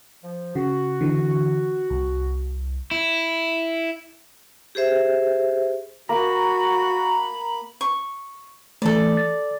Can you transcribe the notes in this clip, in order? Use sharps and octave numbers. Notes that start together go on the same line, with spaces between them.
F3
C#3 F#4
D3 E3
C2
E4
G4 G#4 C5 E5
A#3 F#4 A#5 B5
C#6
E3 A3 A4 D5
A6